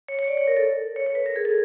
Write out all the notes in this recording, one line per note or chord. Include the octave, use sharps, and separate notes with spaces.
C#5
C#5
D5
C#5
A#4
A4
C#5
C#5
B4
A#4
G#4
A4